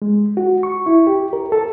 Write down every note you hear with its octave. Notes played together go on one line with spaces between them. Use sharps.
G#3
F#4
C#6
E4
G4
A#4
A4